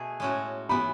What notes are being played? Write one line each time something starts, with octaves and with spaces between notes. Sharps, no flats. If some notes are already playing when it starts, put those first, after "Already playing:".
Already playing: B2 A3 B3 G#4
A2 G#3 C#4 F#4
A2 E3 B3 B5